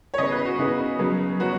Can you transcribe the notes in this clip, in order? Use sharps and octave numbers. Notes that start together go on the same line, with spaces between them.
C#5
C#3 B3 D#5
B4
F#4
C#3 B3 D#4
C#3 F#3 B3
F#3 B3 F#4